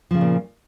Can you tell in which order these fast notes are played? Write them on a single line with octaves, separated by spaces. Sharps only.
F3 C#3 B3 A#2